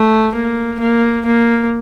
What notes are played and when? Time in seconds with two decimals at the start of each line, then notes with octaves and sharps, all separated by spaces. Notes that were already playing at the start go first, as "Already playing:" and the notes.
Already playing: A3
0.35 A#3
0.80 A#3
1.25 A#3